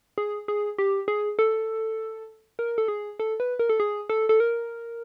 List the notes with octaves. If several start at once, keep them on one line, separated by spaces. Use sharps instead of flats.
G#4
G#4
G4
G#4
A4
A#4
A4
G#4
A4
B4
A#4
A4
G#4
A4
A4
A#4